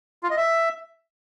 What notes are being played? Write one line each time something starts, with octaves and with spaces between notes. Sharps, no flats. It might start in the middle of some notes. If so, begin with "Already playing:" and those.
F4
D#5
E5